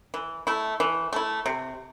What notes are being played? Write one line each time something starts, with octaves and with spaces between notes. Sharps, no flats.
E3
A3 E4
E3
A3 E4
C3